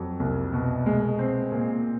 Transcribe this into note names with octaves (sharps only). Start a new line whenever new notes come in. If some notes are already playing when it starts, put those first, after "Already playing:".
Already playing: F2 F#3
C2
B2
G#3
C4
A#2